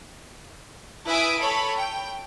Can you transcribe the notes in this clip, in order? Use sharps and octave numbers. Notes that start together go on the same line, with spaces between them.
E4 B4 E5 G#5 D#6 D7
A4 C#5 B5
G5